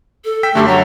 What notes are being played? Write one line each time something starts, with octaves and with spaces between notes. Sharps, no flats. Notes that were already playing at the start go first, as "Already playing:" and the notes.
A4
G5 E6 B6
F#2 D3 A3 G4
F#3 A#5